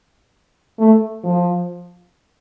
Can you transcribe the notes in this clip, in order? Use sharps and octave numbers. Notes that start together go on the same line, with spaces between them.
A3
F3